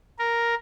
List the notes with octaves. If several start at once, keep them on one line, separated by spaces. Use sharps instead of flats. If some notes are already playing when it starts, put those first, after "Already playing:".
A#4